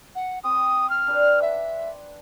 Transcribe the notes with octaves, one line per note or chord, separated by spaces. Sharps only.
F#5
C4 D#6
F6
D4 B4
E5